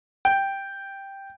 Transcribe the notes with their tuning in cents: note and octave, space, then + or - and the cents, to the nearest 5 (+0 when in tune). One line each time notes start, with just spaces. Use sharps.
G5 +0